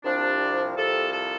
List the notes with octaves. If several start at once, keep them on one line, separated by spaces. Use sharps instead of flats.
C2 C3 F3 D4
C2 C3 F3 A4
A4